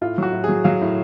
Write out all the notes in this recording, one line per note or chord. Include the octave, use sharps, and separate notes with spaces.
A2 F4
F#3 F#4
A2
G#4
F#3
F#3 F5
A2